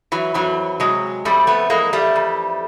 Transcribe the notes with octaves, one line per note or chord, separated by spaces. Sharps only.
E3 F#3
F2 E3 F#3
C3 F#3 G#3
F2 G3 A3
A3 B3
E3 G#3 A#3
G3 A3
F2